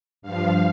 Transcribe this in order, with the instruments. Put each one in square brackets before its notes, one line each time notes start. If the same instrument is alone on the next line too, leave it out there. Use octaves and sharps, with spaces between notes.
[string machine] G2 F3 F5